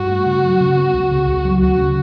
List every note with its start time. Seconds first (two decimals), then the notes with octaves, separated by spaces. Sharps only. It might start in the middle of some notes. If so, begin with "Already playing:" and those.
Already playing: G2 F#4
0.10 A3
0.26 C#3
0.44 F#3
0.60 C#3
0.77 B3
0.93 C#2
1.11 C#3
1.28 C#2
1.45 F#3
1.61 D2 F#4
1.78 C#3